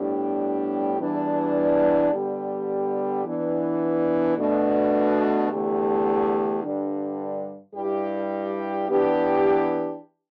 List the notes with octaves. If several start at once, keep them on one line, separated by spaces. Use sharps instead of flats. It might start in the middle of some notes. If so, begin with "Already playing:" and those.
Already playing: A2 G3 B3 D4 G4
E2 E3 G3 B3 D4
D3 G3 B3 G4
E3 B3 D4
B2 A3 D4
E2 D3 A3 G4
G2 D3 G3 D4
G2 G3 E4 G4
E3 B3 D4 G4